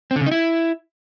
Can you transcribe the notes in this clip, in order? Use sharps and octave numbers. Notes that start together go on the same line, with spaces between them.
C4
D3
C#3
D#4
E4